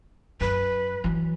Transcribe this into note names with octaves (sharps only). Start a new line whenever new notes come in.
F#2 B4
E3 F#3